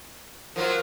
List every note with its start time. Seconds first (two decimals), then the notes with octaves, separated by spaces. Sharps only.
0.56 F3 F#3 F4 A#4